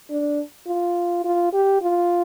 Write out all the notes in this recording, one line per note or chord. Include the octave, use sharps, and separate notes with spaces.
D4
F4
F4
G4
F4